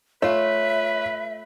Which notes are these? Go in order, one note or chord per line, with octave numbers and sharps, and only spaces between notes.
A3 F4 B4 C#5 E5